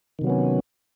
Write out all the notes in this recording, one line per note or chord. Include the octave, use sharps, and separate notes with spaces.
C3 D#3 F#3 B3 C#4